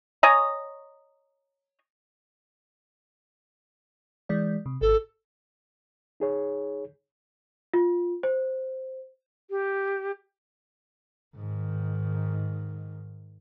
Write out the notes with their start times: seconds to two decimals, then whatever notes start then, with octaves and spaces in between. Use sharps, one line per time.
0.23 C#5 D#5 G#5 A#5
4.29 E3 G#3 D5
4.66 C3
4.81 G#1 A4
6.20 D#4 G#4 C#5
7.74 F4
8.23 C5
9.50 G4
11.36 G#2 D#3